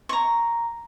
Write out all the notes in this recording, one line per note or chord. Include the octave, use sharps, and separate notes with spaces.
A#5 C#6